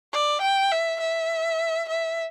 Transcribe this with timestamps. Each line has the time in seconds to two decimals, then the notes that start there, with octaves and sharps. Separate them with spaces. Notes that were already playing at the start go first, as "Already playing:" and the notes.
0.13 D5
0.42 G5
0.72 E5
1.01 E5
1.89 E5